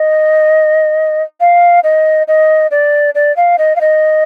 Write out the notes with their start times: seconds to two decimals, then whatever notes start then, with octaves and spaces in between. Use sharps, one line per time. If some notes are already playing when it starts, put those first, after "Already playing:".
Already playing: D#5
1.40 F5
1.84 D#5
2.28 D#5
2.71 D5
3.15 D5
3.37 F5
3.58 D#5
3.76 F5
3.81 D#5